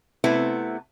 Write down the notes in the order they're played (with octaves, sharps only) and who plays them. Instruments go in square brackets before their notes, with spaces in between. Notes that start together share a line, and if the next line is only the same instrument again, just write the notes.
[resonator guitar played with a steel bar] C3 A3 B3 C4 E4 B4